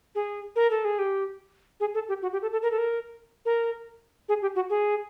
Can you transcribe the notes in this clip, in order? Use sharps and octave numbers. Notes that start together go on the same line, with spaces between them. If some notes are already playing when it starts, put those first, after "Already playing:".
G#4
A#4
A4
G#4
G4
G#4
A4
G4
F#4
G4
A4
A4
A#4
A4
A#4
A#4
G#4
G4
F#4
G#4